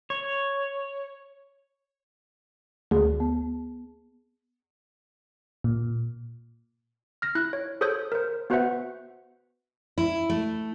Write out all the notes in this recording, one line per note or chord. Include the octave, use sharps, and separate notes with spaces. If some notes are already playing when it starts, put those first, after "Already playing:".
C#5
D2 G#4
B3
A#2
F6 A#6
E4 F#6
C#5
G#4 A4 C5 C#5 D#6 G6
A#4 C5
B3 F#4 B4 C5 E5 F#5
E4
A3